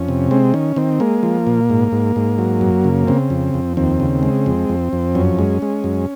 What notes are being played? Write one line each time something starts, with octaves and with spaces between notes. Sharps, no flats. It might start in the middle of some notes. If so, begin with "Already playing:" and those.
Already playing: F2 C#4
C3
G#3 C4
D#3 C#4
D#3 C4
G#3 A#3
F3
A#2
G#2
G#2
G#2
F#3
F#2
C#3
C#3 C4
F2
F2
D#2 C4
C#3
G#3
F2
F2
F2
F#2 C#4
G#3
G#3
F#2